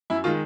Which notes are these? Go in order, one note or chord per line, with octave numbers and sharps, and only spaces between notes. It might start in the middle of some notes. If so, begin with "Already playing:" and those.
F#2 E4
D#3 G#3 F4